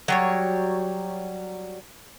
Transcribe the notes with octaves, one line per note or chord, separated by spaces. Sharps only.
F#3 G3 C#5